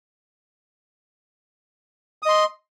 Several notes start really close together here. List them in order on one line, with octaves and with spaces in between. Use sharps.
D#6 D#5 C6